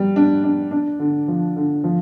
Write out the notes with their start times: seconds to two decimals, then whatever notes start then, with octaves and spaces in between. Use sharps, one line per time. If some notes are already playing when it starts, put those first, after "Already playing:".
Already playing: G3
0.16 D4
0.44 D4
0.71 D4
0.99 D3
1.28 F3
1.56 D3
1.84 F3